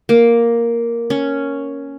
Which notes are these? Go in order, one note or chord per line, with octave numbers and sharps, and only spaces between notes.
A#3
C#4